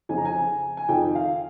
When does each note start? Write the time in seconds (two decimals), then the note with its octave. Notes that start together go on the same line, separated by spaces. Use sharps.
0.09 F2 C#3 F3 G#5
0.17 A#5
0.25 G#5
0.77 G#5
0.89 F2 D#3 G5
1.15 F5